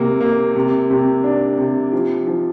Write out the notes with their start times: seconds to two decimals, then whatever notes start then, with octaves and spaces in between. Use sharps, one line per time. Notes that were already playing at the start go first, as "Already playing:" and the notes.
Already playing: C3 A#3
0.21 A#3
0.56 C3
0.90 C3
1.24 D4
1.58 C3
1.93 F3
2.27 F3